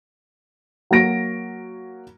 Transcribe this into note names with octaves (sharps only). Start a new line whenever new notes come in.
F#3 A#3 F#4 A#6 D7